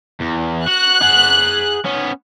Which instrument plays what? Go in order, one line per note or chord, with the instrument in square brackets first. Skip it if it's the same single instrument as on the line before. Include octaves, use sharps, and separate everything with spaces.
[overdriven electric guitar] E2
[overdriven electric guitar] F#4 [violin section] F#6
[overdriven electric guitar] G#4 F#5
B3 C#4